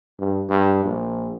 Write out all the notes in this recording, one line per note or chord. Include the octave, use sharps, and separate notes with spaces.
G2
G2
A#1